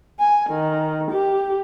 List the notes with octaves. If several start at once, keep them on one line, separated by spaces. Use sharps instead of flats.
G#5
D#3
G4